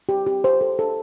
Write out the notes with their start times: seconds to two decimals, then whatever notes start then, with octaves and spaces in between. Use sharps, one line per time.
0.09 G4
0.27 G4
0.44 C5
0.61 A4
0.79 A4